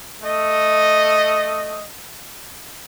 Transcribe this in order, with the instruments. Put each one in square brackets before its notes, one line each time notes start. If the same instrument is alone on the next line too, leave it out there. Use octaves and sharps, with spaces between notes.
[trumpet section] A3 D#5